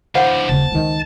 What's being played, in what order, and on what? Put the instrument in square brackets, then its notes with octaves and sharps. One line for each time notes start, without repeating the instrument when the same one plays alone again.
[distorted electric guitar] E3 D4 [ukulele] C5 F5 F#5
[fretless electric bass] D#1 C#3 A#3 [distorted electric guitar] A5
[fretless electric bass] C#2 D#3